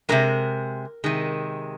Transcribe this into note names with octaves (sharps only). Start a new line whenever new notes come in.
C3 D#3 G#3 A#4
C3 D#3 G#3